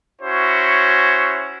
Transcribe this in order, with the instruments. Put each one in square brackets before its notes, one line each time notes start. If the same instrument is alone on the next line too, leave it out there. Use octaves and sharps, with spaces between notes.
[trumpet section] C#4 E4 F#4 C5 C#5